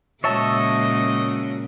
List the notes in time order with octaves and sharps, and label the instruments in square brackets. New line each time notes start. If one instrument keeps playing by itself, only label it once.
[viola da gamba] A#2 C#3 [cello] G#3 F#4 [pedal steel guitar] C#5 E5 A5 [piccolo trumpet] D#5